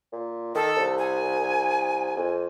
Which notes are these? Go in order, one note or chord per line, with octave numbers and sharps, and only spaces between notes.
A#2
D#3 A4
C2
G#5
F2